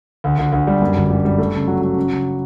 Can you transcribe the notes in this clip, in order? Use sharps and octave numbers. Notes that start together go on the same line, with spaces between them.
D2
D2
D2
G3
F#2
G1
G3
G3
A3
C#3
F#3
F#3
C#3
C#3